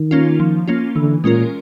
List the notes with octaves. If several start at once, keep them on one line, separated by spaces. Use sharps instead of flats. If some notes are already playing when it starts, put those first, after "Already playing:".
Already playing: D#3
A#3 C#4 F4
F3
A#3 C#4 F4
D3 E3
A#2 G#3 C#4 F4 A#4